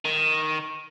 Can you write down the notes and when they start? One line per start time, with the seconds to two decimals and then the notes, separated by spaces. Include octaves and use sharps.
0.05 D#3